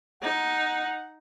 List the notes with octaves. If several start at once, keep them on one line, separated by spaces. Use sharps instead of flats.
D#4 F#5